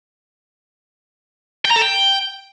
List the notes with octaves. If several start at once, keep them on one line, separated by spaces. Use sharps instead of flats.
G5
A#5
A4
G5